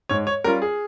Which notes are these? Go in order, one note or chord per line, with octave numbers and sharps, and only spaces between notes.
G#2 C#5
C#5
G3 C#4 F4 A#4
G#4